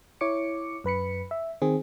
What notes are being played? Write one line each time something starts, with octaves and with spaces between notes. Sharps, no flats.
E4 C#5 D6 C#7
F#2 B4 B5 C#7
E5
D#3 C4 G#4